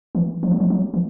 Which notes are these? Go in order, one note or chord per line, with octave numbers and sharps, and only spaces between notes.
E3
F3
F#3
F3
F#3
E3